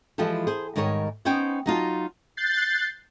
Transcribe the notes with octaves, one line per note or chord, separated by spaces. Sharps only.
E3 F3 G#3 F4 G4 A4
G#4 C5
G#2 D#3 G3 A#4 C#5 G#5
B3 C#4 D#4 C5 G5 G#5
F#3 D#4 F4 A5
F#6 G6 A6 C7